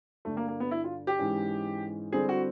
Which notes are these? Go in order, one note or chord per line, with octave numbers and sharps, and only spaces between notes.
G2 D3 G3 A3
A#3
A#3
B3
E4
F4
G4
G#2 E3 G#3 C#4
D3 G3 C4 E4 G#4 A4
F#4